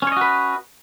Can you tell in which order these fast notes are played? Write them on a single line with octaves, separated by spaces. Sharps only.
C#4 C#5 D#5 F#4 B4